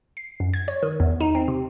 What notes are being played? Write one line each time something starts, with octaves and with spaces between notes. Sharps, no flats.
C7
F#2
G#6
C#5
D#3
E2
D#4
C4
C3